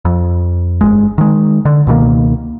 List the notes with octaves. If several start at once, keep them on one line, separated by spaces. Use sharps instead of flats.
F2
G1 C#2 G#3
D#3 G#3
D3
C#2 B2 D#3 A#3